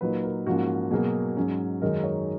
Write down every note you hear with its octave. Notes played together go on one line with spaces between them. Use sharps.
A#2 F#3 A#3 D#4 B4
A#4
G#2 F3 A#3 C#4 F#4
B2 F#3 A#3 G#4
G#2 F#3 C#4
F#2 D#3 G#3 D#4 A#4
C#5